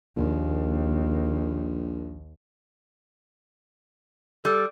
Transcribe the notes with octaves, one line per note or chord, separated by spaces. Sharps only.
A#1 D#2
G3 A4